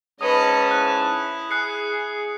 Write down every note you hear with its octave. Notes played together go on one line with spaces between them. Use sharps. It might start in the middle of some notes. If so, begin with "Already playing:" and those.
G#2 C#4 B4 D#5 A5 D#6
E4 F#6
G#4 F#6 C7 C#7